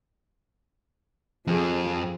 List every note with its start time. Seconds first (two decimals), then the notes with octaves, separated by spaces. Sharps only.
1.47 F2 F3 G#4